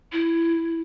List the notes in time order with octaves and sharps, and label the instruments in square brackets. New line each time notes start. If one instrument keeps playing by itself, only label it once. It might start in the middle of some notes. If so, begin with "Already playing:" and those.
[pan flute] E4